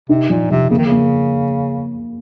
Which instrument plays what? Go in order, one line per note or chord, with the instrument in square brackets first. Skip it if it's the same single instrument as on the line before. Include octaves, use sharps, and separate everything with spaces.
[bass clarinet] C3 [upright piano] D#4
[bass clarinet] A#2 [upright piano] F3
[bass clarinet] C3 [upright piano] F3
[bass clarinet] C#3 [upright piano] A#3
[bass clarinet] D#3
C#3
[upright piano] A#3